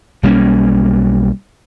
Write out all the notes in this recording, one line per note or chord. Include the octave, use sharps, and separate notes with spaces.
B1 G3 A#3 C#4